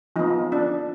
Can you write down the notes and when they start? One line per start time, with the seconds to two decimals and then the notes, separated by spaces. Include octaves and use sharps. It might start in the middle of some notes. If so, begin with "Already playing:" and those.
0.16 F3 B3 D#4
0.52 D4